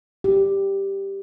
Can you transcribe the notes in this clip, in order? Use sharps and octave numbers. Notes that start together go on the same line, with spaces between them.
G4